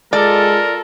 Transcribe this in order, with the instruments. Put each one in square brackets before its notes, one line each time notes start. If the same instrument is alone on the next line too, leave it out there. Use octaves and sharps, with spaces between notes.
[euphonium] G#3 [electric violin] F4 A4 [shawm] A#4 [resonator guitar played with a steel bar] D5